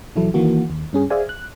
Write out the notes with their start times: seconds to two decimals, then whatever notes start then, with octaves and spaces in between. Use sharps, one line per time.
0.16 A#1 E3 F#3 E4 A4
0.34 D#3 E3 A#3 F#4
0.70 D#2
0.93 G2 C#4 G#4
1.10 G#4 C5 D5 E5 F5 G#5
1.29 F#6